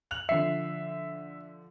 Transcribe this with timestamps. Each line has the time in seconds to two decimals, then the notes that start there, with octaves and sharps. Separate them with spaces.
0.11 F#6 F7 F#7
0.29 D3 F3 E5 C7